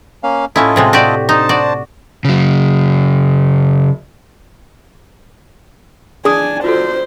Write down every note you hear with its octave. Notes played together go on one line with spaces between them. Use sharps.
A#3 C#4 F5
A2 C#4 E4 F4 A4 D#5
A2 C3 G#3
F#4 G4 D5
D4 D#4 C5 A5
F#4 D5
C#3 F#3
D4 G#4 G#5 D#6
F4 F#4 A4 C5